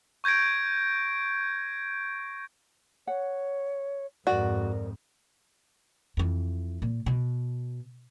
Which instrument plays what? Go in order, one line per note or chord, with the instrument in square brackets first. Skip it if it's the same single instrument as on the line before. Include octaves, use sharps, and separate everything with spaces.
[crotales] C#6 G6 G#6 A#6 D7
[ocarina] C#5 [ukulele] F#5
[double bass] F2 G#2 [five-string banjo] F#4 [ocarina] A#4 [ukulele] D5
[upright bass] F2 E3
A#2
B2